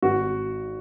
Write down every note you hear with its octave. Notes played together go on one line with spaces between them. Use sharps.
G#1 F#4